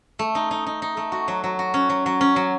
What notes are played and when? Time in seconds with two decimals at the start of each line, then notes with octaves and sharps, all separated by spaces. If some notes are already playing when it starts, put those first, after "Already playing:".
0.19 A3
0.35 D#4
0.51 D#4
0.66 D#4
0.82 D#4
0.97 A3
1.12 F#4
1.28 F#3
1.44 F#3
1.59 F#4
1.74 C#4
1.89 F#3
2.06 F#3
2.21 C#4
2.36 F#3